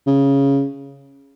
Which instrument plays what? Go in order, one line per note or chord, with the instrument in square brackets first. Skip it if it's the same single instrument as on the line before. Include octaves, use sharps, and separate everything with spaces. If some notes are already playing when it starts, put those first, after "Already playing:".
[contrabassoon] C#3